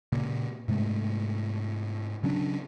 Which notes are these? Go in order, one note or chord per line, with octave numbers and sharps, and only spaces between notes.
A#2 C#3 A#3
G#2 C3 G#3 A3
C#3 F#3 C#4 D4